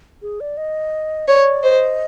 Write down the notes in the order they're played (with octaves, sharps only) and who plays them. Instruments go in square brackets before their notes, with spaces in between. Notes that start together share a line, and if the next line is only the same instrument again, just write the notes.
[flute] G#4
D5
D#5
[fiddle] C#5 [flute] D5
[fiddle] C5 [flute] D#5